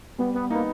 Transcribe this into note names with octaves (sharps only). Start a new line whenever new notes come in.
G3 B3
B3
A#3 B3 D#4